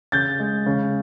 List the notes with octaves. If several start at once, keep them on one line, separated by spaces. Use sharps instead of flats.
C#3 G6 A6
G#3
C#3